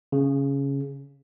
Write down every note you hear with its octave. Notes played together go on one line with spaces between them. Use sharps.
C#3